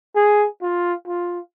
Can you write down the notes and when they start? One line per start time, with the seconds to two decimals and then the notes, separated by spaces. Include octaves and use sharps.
0.15 G#4
0.62 F4
1.07 F4